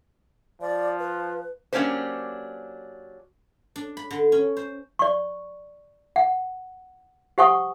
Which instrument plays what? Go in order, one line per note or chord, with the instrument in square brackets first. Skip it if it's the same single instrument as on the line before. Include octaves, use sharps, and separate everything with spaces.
[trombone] F3 [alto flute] D5
[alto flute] B4
[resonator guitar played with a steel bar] F#3 A#3 C#4 D4 G4 C5
[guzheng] D4
B5
D3
C#4
C5
[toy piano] D5 C#6
F#5
G4 C5 F#5 G#5 C#6 D#6